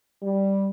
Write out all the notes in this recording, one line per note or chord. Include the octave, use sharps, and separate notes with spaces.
G3